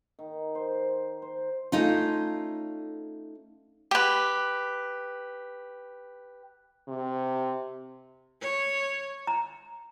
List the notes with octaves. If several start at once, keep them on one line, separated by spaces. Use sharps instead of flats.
D#3
C5
C5
A3 C#4 D#4 F4
G4 B4
C3
C#5
A#5